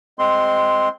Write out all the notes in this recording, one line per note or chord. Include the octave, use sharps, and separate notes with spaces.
G#3 C4 C6